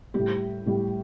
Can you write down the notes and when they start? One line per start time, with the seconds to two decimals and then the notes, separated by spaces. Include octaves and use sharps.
0.14 A2 G3 G4
0.66 A2 G3